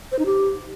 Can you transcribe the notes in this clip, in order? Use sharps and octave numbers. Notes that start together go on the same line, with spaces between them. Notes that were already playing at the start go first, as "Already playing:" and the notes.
C5
D#4
G4